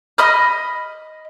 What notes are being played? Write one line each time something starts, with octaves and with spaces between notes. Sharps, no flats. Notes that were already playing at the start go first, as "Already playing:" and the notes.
D#5 B5 D#6 F6